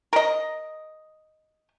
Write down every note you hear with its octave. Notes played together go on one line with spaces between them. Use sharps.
A#4 D#5